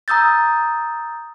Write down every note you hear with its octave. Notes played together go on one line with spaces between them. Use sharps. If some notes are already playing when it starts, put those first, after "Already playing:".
A#5 D#6 E6 G6 A6